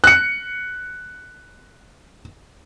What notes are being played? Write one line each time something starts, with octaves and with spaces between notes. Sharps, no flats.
F#6 C#7